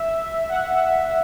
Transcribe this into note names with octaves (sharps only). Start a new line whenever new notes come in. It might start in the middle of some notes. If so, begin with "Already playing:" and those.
Already playing: E5
F#5
F#5